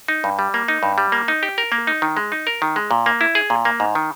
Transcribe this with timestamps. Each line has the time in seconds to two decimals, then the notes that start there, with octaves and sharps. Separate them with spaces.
0.08 D#4
0.24 G2
0.39 G3
0.54 A#3
0.68 D#4
0.83 G2
0.98 G3
1.12 A#3
1.28 D#4
1.43 G4
1.58 A#4
1.72 A#3
1.87 D#4
2.02 D#3
2.17 G#3
2.32 D#4
2.47 A#4
2.62 D#3
2.76 G#3
2.91 A#2
3.06 A#3
3.21 E4
3.35 G#4
3.50 A#2
3.65 A#3
3.80 G#2
3.95 D#3